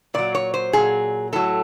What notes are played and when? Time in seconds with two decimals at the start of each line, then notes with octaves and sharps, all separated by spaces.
0.14 A#2 F#3 D5
0.35 C#5
0.54 C5
0.73 A#2 F#3 G#4
1.33 A2 F#3 A4